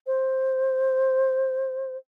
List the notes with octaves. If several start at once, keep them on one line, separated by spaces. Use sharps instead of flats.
C5